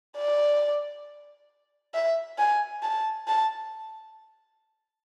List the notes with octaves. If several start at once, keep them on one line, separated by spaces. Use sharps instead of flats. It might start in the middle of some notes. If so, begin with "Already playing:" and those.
D5
E5
G#5
A5
A5